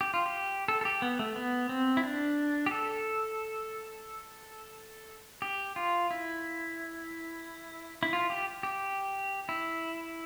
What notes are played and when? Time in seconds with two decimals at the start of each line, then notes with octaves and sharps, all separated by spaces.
0.01 G4
0.14 F4
0.26 G4
0.68 A4
0.81 A4
0.85 G4
1.02 B3
1.19 A3
1.36 B3
1.69 C4
1.97 E4
2.03 D4
2.66 G4
2.71 A4
5.42 G4
5.76 F4
6.11 E4
8.03 E4
8.13 F4
8.30 G4
8.63 G4
9.49 E4